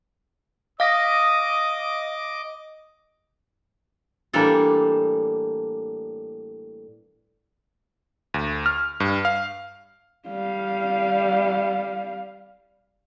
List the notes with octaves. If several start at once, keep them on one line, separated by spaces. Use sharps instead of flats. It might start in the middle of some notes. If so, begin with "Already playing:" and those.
D#5 F5 D6 D#6 A#6
A2 E3 G3 A#3 D4 A4
D2
F6
G2
F5
G3 F5